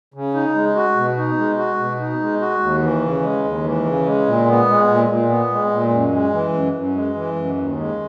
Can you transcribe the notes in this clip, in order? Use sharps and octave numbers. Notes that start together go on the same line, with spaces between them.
C#3
D#4
G#3
F#4
B2
D#4
G#3
F#4
B2
D#4
G#3
F#4
D#2
E3
C#3
G#3
D#2
E3
C#3
G#3
A#2
B3
G#3
A#2
A#2
B3
G#3
A#2
F#2
G#3
E3
F#2
F#2
G#3
E3
F#2
D#2
G#3